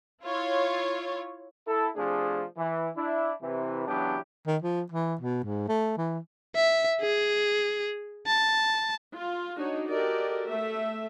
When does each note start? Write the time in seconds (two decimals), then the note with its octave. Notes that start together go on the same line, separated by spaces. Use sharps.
0.22 E4 F4 C#5
1.67 E4 A4
1.96 C3 F3 A3 D4 G#4
2.58 E3
2.97 D4 E4
3.42 C3 E3
3.88 C#3 E3 F#3 B3 D4 G4
4.47 D#3
4.62 F3
4.92 E3
5.21 B2
5.44 G#2
5.68 A3
5.98 E3
6.56 E5
7.01 G#4
8.27 A5
9.15 F4
9.56 D4 D#4 F#4 C#5
9.89 F#4 G4 A4 A#4 D5 D#5
10.47 A3 E5